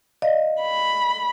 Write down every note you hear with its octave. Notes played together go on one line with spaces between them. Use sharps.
D5 D#5 F5
B5